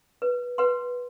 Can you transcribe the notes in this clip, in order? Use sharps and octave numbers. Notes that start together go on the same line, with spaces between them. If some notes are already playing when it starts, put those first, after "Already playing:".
B4
B4 F#5 C6